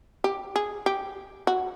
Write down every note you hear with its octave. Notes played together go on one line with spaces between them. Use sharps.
G4
G#4
G4
F#4